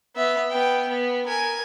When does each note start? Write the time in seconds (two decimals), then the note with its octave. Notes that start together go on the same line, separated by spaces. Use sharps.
0.16 B3 E5
0.50 B3 G5
0.88 B3
1.26 A#4 G#5